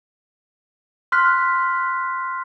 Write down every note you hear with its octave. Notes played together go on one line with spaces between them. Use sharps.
C6 F6 F#6 B6